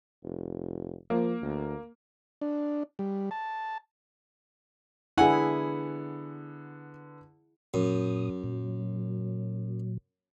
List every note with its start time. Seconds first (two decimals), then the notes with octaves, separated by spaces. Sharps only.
0.24 F1
1.10 F3 A#3
1.42 D2
2.41 D4
2.99 G3
3.31 A5
5.18 D3 B3 E4 G#4 F#5 G#5
7.74 F#2 A#2 D#6
8.44 A#2 F#3